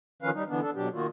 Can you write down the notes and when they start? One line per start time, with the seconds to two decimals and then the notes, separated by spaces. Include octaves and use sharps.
0.22 D#3 F3 C#4 B4 F5
0.34 G3 D#4
0.49 D3 E3 B3 D4
0.62 D4 A4
0.75 B2 F#3 D4 G4
0.94 D#3 A#3 F4 F#4